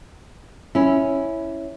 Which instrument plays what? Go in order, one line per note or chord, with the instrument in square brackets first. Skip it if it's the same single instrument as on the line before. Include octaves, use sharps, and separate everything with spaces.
[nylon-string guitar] C#4 E4